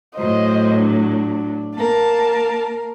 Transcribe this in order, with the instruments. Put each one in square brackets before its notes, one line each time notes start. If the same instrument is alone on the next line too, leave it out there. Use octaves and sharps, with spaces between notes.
[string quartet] A2 F#3 [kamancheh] C5 D#5
[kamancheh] D4
[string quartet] A#3 A#4 [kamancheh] A5